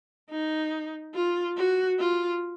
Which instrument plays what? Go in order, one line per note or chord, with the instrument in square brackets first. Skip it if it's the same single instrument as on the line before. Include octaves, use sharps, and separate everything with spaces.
[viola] D#4
F4
F#4
F4